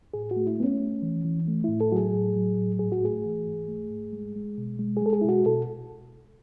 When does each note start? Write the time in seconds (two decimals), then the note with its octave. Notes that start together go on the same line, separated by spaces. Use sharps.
0.14 A2 G#4
0.31 F#4
0.36 A3
0.47 E4
0.58 A3 B3
0.64 C#4
0.80 A3
1.02 E3
1.24 E3
1.47 A3
1.64 A2 E4
1.81 A4
1.92 F#3 F#4
1.96 G#4
2.14 A2
2.36 F#3
2.58 A2
2.79 G#2 G#4
2.92 F#4
3.03 A3 G#4
3.25 E3
3.47 G#2
3.68 A3
3.90 G#2
4.13 G#3
4.36 G#3
4.58 B2
4.79 G#3
4.97 G#4
5.02 G#3 A4
5.13 G#4
5.21 E4
5.24 B2 F#4
5.46 B2 A4